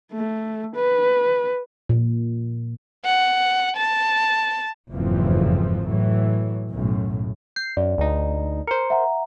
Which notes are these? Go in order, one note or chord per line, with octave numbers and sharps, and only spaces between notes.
A3
B4
A#2
F#5
A5
F#1 F2 G#2 E3 F3
A2 E3 F#3
B1 F#2 A2
G6 C7
F#2 D5
D2 D#4
A#4 C5 C#7
E5 F#5 A#5